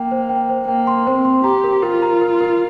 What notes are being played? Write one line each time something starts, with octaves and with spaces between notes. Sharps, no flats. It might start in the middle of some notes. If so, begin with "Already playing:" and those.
Already playing: A#3 G5
C5
G5
C5
A#3 G5
C6
C4 C5
C6
G4 A#5
A#4
F4 A#4
A#5
A#4
A#4